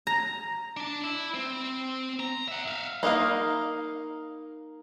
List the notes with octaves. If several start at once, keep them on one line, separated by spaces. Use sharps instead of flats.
A#5
D4 A5
E4
C4
A#5
E5 F#5
E5 F5
A#3 D#4 A#4 F5